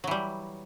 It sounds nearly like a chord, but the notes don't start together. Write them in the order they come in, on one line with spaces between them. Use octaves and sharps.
F#3 E3 G3